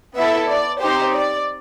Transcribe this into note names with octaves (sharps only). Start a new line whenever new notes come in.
B3 E4 A4 E5
D5
C4 D#4 G4 C5
D5